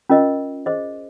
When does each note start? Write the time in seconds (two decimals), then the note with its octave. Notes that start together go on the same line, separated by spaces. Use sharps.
0.09 C#4 F4 A#4 D#5
0.66 G#4 C5 D#5